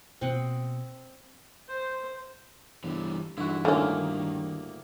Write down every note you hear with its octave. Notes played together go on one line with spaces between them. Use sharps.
B2 A#3 C4 D#5 F#5
C5
G1 E3 G3
G2 D3 E3 E4 F#4
D2 A2 D3 D#3 A#3 C#4